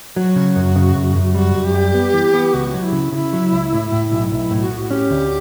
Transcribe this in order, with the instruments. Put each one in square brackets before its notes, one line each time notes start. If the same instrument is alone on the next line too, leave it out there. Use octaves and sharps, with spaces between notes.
[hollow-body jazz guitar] F#3 [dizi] F#4
[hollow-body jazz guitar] C#3
F#2
C#3
F#2
F#2
[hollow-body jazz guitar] G3 [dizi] F#4
[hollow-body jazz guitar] F#2
[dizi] G4
[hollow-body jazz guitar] G3
B3
E3
B3
[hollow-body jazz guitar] C#2 [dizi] F#4
[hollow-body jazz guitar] F#3
[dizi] E4
[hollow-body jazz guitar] C#3
[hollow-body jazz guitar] C#3 [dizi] E4
[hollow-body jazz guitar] F#3
C#2
A2
A2
B1
[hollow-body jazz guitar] B1 [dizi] E4
[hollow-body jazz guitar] A2
[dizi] E4
F#4
[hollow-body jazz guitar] A2
[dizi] F#4
[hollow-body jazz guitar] C#4 [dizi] G4
[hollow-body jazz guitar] D2